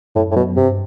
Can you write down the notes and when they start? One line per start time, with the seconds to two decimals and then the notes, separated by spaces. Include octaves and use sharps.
0.16 F#2 A2
0.31 A2
0.36 B2 F#3
0.40 B3
0.56 G2 C3